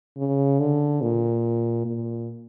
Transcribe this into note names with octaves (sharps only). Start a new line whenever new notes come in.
C#3
D3
A#2
A#2